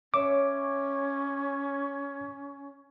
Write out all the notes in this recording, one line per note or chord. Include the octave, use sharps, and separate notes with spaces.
C#4 C#5 E5 D6